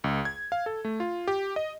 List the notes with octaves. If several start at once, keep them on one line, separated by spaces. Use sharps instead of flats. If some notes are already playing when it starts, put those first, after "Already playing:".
C#2
G#6
F5
A4
A3
F4
G4
D#5